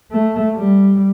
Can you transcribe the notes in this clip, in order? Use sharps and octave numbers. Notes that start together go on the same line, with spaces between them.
A3
G3